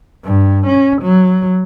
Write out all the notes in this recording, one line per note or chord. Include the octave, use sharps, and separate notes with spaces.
G2
C#4
F#3